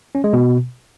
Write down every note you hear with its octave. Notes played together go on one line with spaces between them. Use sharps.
C#4
G#3
B2